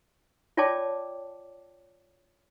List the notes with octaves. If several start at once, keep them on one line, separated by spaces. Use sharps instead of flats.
F4 C#5 D5 G5 A5 D6